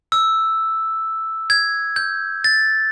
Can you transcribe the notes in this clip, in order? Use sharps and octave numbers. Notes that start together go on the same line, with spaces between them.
E6
G#6
G6
A6